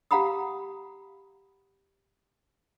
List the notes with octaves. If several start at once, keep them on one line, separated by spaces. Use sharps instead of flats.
G4 F5 F#5 A#5 B5 D#6